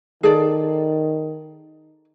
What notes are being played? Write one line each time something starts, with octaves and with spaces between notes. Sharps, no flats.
D#3 G#4 A4 D5